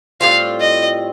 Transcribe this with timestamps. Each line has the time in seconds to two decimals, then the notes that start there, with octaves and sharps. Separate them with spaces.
0.21 A2 G3 C4 F4 F5
0.60 D#5